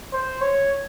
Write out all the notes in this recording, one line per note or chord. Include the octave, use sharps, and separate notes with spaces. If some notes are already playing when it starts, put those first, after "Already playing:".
C5
C#5